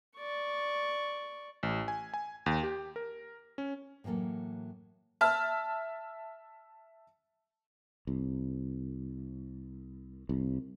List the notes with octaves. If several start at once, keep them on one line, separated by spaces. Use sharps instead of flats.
D5 C#6
A1
G#5
G#5
D#2
G4
A#4
C#4
A2 E3 F#3 A#3 A4
E5 A5 F6
C2
C2